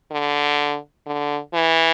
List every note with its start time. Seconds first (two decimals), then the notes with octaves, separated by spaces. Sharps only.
0.11 D3
1.06 D3
1.54 E3